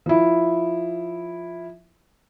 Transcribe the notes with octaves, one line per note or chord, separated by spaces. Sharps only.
F3 E4